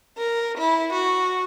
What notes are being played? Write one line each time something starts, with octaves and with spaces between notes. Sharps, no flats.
A#4
E4
F#4